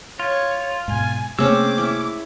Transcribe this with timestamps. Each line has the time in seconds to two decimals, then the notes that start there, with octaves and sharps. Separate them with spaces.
0.19 F4 C#5
0.88 G#2 B2 G#5
1.39 C3 A3 A#3 C4 C#4 G#4 D6 E6
1.78 C#4 E4